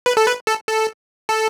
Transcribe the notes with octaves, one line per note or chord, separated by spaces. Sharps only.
B4
A4
B4
A4
A4
A4